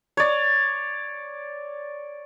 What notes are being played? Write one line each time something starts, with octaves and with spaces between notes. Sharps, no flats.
C#5 D5